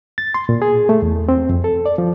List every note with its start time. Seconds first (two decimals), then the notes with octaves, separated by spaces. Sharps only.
0.18 A6
0.34 C6
0.49 A#2
0.62 G#4
0.89 A3
1.02 E2
1.29 C4
1.50 F2
1.64 A4
1.86 D5
1.98 F3